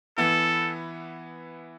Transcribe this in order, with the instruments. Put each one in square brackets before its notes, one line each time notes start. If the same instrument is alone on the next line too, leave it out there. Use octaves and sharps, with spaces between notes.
[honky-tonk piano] E3 B3 E4 [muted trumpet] A4